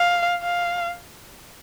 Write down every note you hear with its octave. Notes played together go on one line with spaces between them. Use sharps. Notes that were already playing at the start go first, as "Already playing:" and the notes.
Already playing: F5
F5